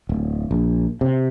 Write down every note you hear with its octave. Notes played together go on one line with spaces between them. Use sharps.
D1
A#1
C3